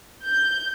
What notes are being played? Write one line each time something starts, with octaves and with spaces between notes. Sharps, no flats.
G6